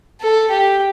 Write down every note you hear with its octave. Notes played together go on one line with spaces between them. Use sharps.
A4
G4